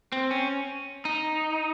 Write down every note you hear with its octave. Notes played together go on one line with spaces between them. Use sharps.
C4
C#4
D#4